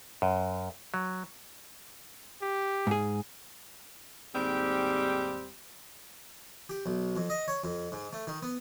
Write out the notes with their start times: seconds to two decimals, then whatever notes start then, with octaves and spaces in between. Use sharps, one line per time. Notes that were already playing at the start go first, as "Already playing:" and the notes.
0.22 F#2
0.94 F#3
2.42 G4
2.87 G#2 G#4
4.34 D#2 G#2 G3 C4 G4
6.69 G4
6.86 B1
7.16 F2
7.30 D#5
7.48 C#5
7.64 F2
7.92 G#2
8.13 A3
8.27 D#3
8.43 B3